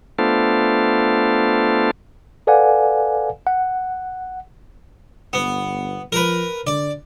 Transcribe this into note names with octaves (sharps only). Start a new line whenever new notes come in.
A3 B3 D4 F4 A4 C5
A4 B4 D5 F5 F#5 G#5
F#5
G1 B3
F3 A#4 B4
D3 D5